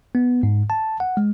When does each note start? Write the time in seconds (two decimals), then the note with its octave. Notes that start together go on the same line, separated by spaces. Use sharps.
0.15 B3
0.43 G#2
0.70 A5
1.00 F#5
1.17 G#3